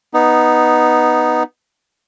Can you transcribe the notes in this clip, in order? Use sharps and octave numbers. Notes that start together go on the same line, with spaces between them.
B3 D#4